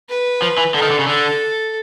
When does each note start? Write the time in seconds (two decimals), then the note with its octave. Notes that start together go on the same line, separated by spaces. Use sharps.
0.09 B4
0.42 F3
0.58 E3
0.74 D3 A4
0.82 D#3
0.90 D3
0.99 C#3
1.07 D3 A4